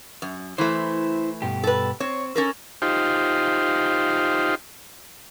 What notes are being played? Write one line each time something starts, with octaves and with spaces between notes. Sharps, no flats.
F#2
E3 A3 E4 C5
G2 B2 G4
A4 B4
C4 C#5
C#4 A4 A#4
D#4 F4 G4 C5